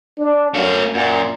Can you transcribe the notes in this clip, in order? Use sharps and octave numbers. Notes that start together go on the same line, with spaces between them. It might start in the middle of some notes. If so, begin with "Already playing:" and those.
D4
F#2 A3 F5
F#2 A#2